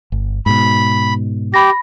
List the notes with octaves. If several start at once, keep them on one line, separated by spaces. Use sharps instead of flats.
G1
G#2 B2 B5
G4 B5 A#6